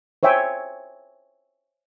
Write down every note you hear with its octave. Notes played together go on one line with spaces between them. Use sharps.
C5 C#5 E5 G5 G#5